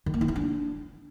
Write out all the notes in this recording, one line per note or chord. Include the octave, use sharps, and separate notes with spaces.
D#3
A#3
E4
C4
D4